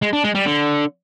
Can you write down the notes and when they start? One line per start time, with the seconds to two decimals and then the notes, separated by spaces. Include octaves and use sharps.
0.02 G#3
0.13 D4
0.24 G#3
0.35 G3
0.46 D3